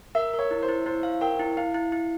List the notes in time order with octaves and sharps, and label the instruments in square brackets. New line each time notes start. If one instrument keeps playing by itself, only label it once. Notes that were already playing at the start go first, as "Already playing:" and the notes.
[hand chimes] A#4 [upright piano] E5
[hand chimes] A#4
[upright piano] C#5
[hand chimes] E4
[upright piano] C5
[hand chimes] E4
[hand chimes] E4 [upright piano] C5
[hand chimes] F5
[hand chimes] A#4 [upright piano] G5
[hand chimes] E4
[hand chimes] E4 [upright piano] F5
[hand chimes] E4
E4